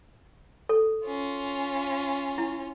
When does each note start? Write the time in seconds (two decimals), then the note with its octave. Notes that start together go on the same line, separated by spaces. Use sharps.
0.69 A4
1.05 C#4 F4
2.38 E4